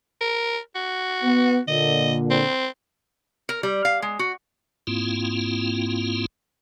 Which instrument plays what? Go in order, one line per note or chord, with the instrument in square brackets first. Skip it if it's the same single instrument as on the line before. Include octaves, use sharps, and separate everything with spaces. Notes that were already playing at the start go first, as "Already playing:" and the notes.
[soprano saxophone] A#4
F#4
[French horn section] B3
[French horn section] A#2 D3 [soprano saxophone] D#5
[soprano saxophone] C4
[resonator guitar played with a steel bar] A#4
G3
F5
G#3
F#4
[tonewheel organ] G#2 A#3 C4 E4 F4